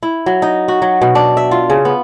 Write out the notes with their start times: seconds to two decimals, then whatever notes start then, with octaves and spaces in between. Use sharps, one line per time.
0.03 E4
0.26 F#3
0.42 D#4
0.68 F#4
0.82 F#3
1.02 B2
1.15 D4
1.37 E5
1.51 F4
1.70 C#3
1.85 B3